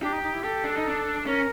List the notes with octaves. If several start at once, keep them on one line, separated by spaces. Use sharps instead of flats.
D4 G4
D#4
D#4
E4
G4 A4
D4
D#4
D4
C#4 A#4